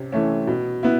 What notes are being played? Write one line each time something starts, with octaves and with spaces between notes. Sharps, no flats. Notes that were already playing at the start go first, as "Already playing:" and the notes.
Already playing: C3 C#4
E3 A3 C#4
B2
B3 E4